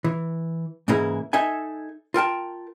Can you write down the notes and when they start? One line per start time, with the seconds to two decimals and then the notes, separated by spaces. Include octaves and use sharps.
0.04 E3
0.88 G#2 C#3 E3 A#3 E4
1.33 D#4 A4 E5 G#5
2.14 F4 A#4 G5 A5